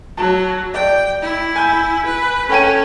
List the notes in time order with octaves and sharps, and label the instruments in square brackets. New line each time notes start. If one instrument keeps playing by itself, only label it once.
[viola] F#3 [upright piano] A5
[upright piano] D5 [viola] G5
[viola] E4
[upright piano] G#5 G6
[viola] B4
[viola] C#4 [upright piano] A4 G5 D#7